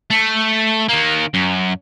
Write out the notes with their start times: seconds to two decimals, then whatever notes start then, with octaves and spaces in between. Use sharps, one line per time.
0.10 A3
0.88 D#3 A#3
1.34 F#2